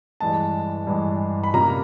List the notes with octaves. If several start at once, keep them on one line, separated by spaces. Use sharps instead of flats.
G2 E3 G#3 A5
G2 E3 G#3
B5
C3 F3 A#3 C#4 A#5